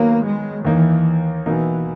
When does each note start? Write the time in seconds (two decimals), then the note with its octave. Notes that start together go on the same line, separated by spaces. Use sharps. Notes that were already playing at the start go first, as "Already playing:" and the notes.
Already playing: D#3 F#3 A#3 B3
0.24 G#3
0.64 D#2 D#3 E3 A#3 D#4
1.46 B2 E3 A#3 D#4